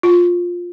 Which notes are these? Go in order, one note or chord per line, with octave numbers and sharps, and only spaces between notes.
F4